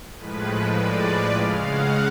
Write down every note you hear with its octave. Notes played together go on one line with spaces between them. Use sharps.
A2 F3 G#3 B4
D5
C#3 G#3 F5
F#5